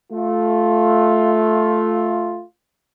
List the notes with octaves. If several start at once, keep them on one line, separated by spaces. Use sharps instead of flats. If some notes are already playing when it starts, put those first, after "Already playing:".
A3 F4